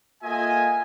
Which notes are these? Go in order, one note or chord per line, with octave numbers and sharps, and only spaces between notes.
A#3 F4 A4 D#5 E5 G#5